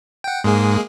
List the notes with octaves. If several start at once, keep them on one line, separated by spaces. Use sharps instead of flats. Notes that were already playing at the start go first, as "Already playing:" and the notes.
F#5 G5
G#2 G#3 A#3 G#4